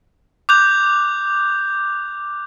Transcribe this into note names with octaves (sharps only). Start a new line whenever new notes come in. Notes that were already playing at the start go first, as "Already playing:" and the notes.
D6 F#6 G6 F7